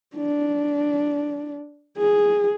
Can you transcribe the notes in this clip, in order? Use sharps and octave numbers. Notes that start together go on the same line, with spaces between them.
D4
G#4